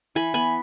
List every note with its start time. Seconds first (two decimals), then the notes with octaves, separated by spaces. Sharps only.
0.15 E3 G#5 B5
0.34 B3 G#5 B5